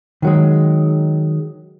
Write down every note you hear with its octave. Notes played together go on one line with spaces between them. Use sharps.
D#3 F#3 G#3